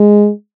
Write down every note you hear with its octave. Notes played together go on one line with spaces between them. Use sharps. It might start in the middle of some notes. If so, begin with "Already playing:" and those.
Already playing: G#3